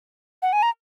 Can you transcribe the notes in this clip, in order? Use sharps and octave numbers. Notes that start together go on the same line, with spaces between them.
F#5
G#5
A#5